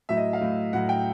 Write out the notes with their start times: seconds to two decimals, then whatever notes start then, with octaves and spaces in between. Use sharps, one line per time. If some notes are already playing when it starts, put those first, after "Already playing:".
0.09 A2 F#3 E5
0.17 D#5
0.33 F5
0.41 A2 F#3
0.73 A2 F#3 F#5
0.89 G5